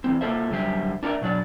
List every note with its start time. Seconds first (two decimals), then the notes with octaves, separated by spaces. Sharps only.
0.04 E3 C4
0.21 A#3 F4 A4 C5 E5
0.50 F#2 D3 G3 A3 C5 E5
1.03 D4 A#4 C#5 D5 E5
1.21 B2 F#3 D4 D5